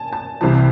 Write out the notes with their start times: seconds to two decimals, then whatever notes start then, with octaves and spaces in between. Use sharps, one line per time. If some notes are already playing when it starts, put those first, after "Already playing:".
Already playing: G#5 A5
0.13 A5
0.41 C2 C3 E3 A5